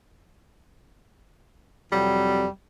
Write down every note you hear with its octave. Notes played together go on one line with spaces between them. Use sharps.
F2 C3 F#3 G3